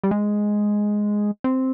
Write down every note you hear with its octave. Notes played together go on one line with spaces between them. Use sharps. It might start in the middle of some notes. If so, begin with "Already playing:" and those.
G3
G#3
C4